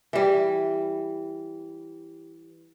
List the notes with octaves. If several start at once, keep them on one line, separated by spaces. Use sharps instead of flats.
E3 G3